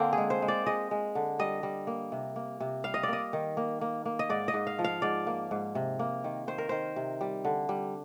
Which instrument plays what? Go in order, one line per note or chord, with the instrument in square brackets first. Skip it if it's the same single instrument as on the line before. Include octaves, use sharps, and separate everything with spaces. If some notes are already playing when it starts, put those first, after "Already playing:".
Already playing: [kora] D3 A#3 C4
G#4
G#3
C5
G#3
D5
G#3 D#5
G#3
D3
G3 D#5
G3
A#3
C3
A#3
C3
G3 F5
D#5
D5
A#3 D#5
D#3
A#3
A#3
A#3
D#5
G#2 D5
D#5
G#2
F5
F3
F5
G#2 D5
A#3
G#2
C3
A#3
D#3
D#3 C5
A#4
D#3 C5
C3
G3
D3
G3